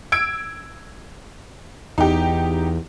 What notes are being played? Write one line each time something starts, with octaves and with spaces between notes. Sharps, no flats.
E6 G#6 D7
E2 D#4 G4